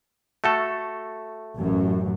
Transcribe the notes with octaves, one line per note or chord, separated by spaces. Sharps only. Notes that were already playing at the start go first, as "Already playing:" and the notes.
A3 F#4 A4
A1 F#2